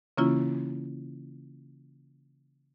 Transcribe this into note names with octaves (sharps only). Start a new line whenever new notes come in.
C#3 E3 A#3 C#4 E4 F4